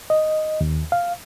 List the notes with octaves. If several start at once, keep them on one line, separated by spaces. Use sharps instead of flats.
D#5
D#2
F5